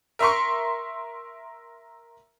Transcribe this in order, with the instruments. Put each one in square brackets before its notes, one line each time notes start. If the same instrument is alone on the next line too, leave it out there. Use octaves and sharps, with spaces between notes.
[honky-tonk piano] A#4 E5 A#5 C6 C#6